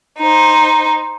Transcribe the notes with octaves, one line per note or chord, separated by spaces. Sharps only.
D#4 C5